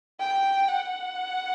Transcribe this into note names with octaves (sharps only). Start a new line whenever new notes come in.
G5
F#5